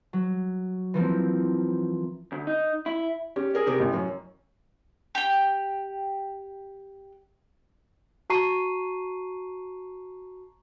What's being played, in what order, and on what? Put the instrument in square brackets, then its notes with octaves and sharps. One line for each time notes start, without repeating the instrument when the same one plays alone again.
[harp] F#3
E3 F3 A#3 C4
[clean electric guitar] D2
D#4
E4
[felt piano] C#4 G4
G#4 A#4 D5
C3 G4 A#4
A1
F#2
[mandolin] G4 G5
[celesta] F#4 A5 A#5 C#6 C7 D#7